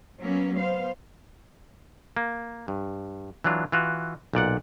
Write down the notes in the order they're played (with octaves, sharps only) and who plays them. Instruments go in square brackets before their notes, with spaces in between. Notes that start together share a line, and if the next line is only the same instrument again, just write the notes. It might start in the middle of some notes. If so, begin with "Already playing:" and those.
[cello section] F#3 A#3 B3 C#4
B3 C5 F5
[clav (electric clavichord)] A#3
G2
E3 F#3 D4 F4
E3 F4 F#4
B1 A#2 D5 F#5